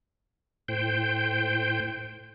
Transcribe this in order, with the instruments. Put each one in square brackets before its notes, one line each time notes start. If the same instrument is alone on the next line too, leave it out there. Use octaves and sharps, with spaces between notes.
[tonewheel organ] A2 C5 G5